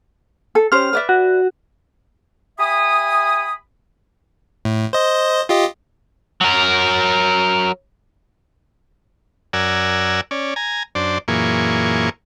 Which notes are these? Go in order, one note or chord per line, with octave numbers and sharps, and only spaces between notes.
A4
C#4 G4 C5 F6
B4 D5 E5
F#4
G4 E5 G#5 B5 D#6
A2
C5 D#5
F4 G4 D#5
F#3 A#4
F#2 A#4 D5 F#5 G#5 E6
C#4 D5
G#5 A#5
F#2 D4 C5 D5
F#2 A#2 E3 A#3 G#4 C#6